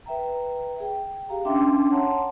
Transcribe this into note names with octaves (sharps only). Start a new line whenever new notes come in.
B4 E5 G5 A#5
G#4 G5
G4 F5 A#5
C#4 D4 E5 G5 C6 D6
C#5 F#5 A5 A#5 C6